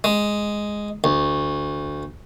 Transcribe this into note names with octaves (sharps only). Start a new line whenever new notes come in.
G#3
D2